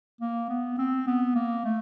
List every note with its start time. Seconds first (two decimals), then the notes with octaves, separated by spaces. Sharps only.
0.21 A#3
0.49 B3
0.78 C4
1.07 B3
1.35 A#3
1.65 A3